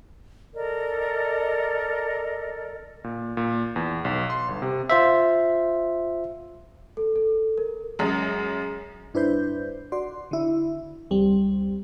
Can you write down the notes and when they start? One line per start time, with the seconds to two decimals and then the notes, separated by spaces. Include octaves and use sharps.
0.54 A4 A#4 D5 D#5
3.04 A#2
3.37 A#2
3.76 E2
4.05 B1
4.30 C6
4.48 G1
4.62 C3
4.90 F4 C5 E5
6.97 A4
7.16 A4
7.58 A#4
7.99 F#2 G#3
9.14 G2 D4 E4 B4 C5 G6
9.92 F#4 D5 C6
10.31 D3 E4
11.10 C#2 G3 C4